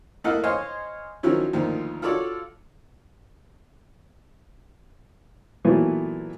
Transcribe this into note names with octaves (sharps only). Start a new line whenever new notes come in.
A3 A#3 E4 D#5 F5 F#5
C5 C#5 D#5 F5 G#5
D#3 F3 F#3 C#4 E4
D2 A#2 D#3 F3
F4 F#4 A4 C#5 D5
A#2 E3 F#3 A3 B3